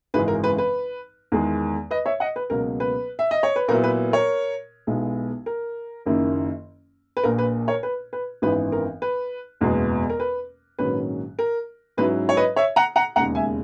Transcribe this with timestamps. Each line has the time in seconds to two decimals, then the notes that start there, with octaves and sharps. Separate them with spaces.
0.14 G#1 F#2 C#3 E3 G#3 B4
0.28 A#4
0.44 B4
0.58 B4
1.32 E2 D#3 G#3
1.91 B4 D#5
2.06 C#5 E5
2.20 D#5 F#5
2.36 B4
2.50 C#2 B2 F#3 A#3 A#4
2.80 B4
3.19 E5
3.31 D#5
3.43 C#5
3.56 B4
3.68 A#2 F#3 B3 E4 A#4
3.84 B4
4.13 A#4 C#5
4.87 B1 B2 G#3 B3 E4
5.46 A#4
6.06 F#1 F#2 D#3 A#3 E4
7.17 B4
7.23 A#1 A#2 A#3 A#4
7.38 B4
7.68 A#4 C#5
7.83 B4
8.13 B4
8.42 G#1 F#2 E3 B3 D#4 B4
8.72 A#4
9.02 B4
9.61 F#1 E2 B2 G#3 B3
10.10 A#4
10.20 B4
10.79 A#1 G#2 D#3 F#3 C#4 B4
11.39 A#4
11.97 G#2 F#3 C#4 E4 B4
12.29 C#5
12.37 B4 D#5
12.56 C#5 E5
12.76 F#5 A#5
12.96 F#5 A#5
13.16 E1 D#2 C#3 G#3 F#5 A#5
13.35 E5 G#5